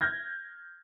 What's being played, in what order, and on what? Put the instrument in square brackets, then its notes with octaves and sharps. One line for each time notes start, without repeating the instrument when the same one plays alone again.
[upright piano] F6 G6 G#6 A#6